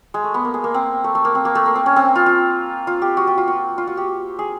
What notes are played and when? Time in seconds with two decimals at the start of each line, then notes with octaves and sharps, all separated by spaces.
0.14 G#3
0.24 A3
0.34 B3
0.45 A#3
0.54 G#3
0.64 A#3
0.74 C4
1.04 A3
1.15 A3
1.25 A#3
1.35 C4
1.45 A#3
1.55 A3
1.66 A#3
1.75 C4
1.86 C#4
1.96 C4
2.16 F4
2.26 F4
2.87 F4
3.02 G4
3.17 F#4
3.27 G4
3.38 F4
3.48 F#4
3.78 F4
3.87 F#4
3.97 G4
4.39 G#4